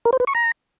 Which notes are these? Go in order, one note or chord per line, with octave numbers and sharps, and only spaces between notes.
A#4
C5
B4
C#6
A#5